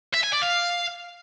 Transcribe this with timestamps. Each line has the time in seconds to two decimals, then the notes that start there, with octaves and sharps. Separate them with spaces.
0.14 E5
0.24 G#5
0.33 D5
0.43 F5